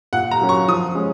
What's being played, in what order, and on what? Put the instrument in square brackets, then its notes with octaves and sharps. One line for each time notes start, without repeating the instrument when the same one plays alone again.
[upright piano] A#2 F#5
A#5
F#3 A#3 C#4
C#6
F3 D#6
G#3 C#4